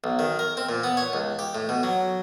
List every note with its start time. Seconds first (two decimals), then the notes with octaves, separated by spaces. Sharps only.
0.04 B1
0.19 D#3
0.39 A#4
0.57 C4
0.69 A#2
0.84 B3
0.97 C#5
1.13 C#2
1.39 G4
1.55 A2
1.69 B2
1.83 F#3